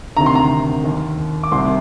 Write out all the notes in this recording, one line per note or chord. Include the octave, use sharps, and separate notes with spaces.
D2 C3 D#3 A#5
C6
A#5
D#2 D#3
D6
C2 C3 D#3 C6